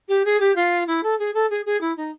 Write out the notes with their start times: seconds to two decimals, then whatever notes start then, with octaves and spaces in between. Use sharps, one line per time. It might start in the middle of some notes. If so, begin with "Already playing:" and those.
0.09 G4
0.25 G#4
0.40 G4
0.56 F4
0.87 E4
1.03 A4
1.19 G#4
1.34 A4
1.50 G#4
1.66 G#4
1.81 E4
1.97 D#4